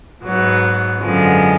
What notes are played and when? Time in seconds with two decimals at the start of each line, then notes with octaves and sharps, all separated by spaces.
0.24 G#2 F#3 B3
1.01 F#2 D3 F3 G#3 B3